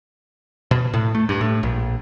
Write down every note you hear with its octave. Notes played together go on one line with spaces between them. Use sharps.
B2
A2
A3
G2
A2
A#1